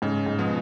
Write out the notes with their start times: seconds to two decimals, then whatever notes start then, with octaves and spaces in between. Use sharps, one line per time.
0.02 G#2 C#3
0.26 G#2
0.39 B2 F3 B3